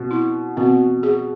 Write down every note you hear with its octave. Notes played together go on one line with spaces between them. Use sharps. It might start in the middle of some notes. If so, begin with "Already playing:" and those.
Already playing: B2 C4
E4
B2 C4
G#4